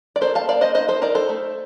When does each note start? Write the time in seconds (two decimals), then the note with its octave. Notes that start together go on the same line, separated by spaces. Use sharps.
0.16 D5
0.21 A#3 A4 C5
0.35 F5 A5
0.48 A#3 D5 F5
0.61 C5 D#5
0.75 D#4 C5 D#5
0.88 A4 C5
1.02 D#4 A#4 D5
1.15 A4 C5
1.29 A3